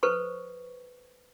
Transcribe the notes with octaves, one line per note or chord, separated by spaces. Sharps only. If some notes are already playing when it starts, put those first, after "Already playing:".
A4 B4 C5 C#6